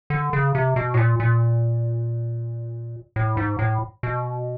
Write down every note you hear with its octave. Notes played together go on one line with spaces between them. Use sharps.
D3
C#3
C3
B2
A2
A#2
A#2
A2
G#2
A2
B2